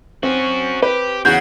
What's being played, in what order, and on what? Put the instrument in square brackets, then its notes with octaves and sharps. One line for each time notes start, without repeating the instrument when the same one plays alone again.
[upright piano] C4 [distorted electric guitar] C#4 F#4
[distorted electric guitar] G4 [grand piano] B4
[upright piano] E2 [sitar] C#3 F#4 [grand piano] G6